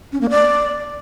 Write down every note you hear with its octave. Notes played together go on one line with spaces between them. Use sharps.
C#4
A#3
D5